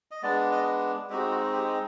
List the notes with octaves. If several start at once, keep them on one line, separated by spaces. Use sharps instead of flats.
D#5
G#3 B3 D4 D5
D#5
G#3 C4 D#4 F#4 G4
F#4
G4